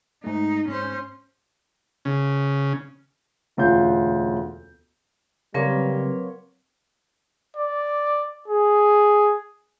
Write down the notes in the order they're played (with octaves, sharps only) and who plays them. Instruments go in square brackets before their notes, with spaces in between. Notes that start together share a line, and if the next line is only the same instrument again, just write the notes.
[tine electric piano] G#2 A3 [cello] D#4
[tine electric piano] G#2 [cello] C#4 C5
[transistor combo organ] C#3
[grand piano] E1 D2 C#4 F4 G6
[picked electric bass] C#3 [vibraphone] F#3 C4 B4 [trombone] G3 [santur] A#3 C#5 C6
[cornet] D5
G#4